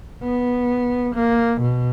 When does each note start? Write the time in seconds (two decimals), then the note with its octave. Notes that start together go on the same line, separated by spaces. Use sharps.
0.23 B3
1.15 A#3
1.61 B2